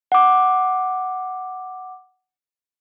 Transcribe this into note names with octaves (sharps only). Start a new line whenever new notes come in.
F#5 D6